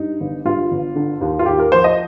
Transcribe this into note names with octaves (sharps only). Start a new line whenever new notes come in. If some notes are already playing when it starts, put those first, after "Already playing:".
Already playing: G2 D#4
G1
G2 F4
G1
D3
D#2
F4
D#2 G4
A#4
F3 C5
D#5